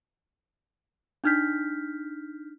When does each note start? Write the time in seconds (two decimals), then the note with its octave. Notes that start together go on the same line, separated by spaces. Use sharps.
1.24 D4 D#4 F6 G6 B6